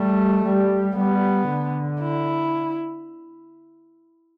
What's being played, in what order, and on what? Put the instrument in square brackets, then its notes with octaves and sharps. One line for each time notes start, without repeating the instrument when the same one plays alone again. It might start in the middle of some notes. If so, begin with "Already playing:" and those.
Already playing: [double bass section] G3 [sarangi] A3
[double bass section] G3
[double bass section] G3 [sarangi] B3
[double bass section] D3
[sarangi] E4